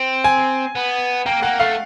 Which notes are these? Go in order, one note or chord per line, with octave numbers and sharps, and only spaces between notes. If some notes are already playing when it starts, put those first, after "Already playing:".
Already playing: C4
G#5
B3
A#3 G5
A#3 F#5
A3 F5